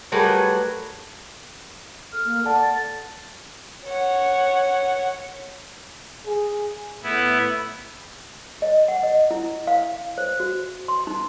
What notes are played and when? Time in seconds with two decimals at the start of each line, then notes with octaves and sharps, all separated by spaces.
0.12 F#3 G3 A3 G#4 A#4 B4
2.12 A4 F6
2.24 A#3
2.45 A4 D5 F#5 A5
2.61 A6
3.84 C#5 F#5
6.26 G#4
7.03 A2 B3 E4
8.62 D#5
8.88 F#5
9.03 D#5
9.31 E4
9.67 F5
10.18 C5
10.40 F#4
10.88 C6
11.07 D#4